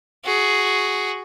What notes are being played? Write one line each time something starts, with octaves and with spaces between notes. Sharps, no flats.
F#4 G#4